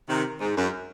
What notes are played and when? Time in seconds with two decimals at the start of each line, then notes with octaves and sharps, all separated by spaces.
0.09 C3 D#3
0.41 G#2
0.57 F#2